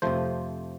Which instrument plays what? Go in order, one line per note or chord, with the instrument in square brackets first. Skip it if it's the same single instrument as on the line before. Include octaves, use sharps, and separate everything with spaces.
[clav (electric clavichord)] F2 C3 F3 A3 C5